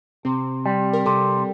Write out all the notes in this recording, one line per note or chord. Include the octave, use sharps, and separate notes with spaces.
C3 C4
G3
A#4
C3 A4